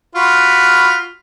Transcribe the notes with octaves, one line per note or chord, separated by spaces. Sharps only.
F4 F#4 B5